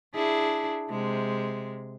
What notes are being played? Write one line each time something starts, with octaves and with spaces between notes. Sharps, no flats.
D4 E4 G#4
C3 G#3